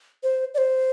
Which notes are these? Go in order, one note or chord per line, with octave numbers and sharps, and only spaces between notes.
C5
D5
C5